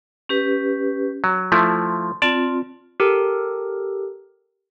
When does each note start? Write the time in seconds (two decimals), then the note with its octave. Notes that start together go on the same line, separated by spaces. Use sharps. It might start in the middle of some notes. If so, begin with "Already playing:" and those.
0.29 C#4 G4 B4
1.24 F#3
1.52 F3 A3 E4 C6
2.22 C4 F4 D5 A5
3.00 G4 A4 A#4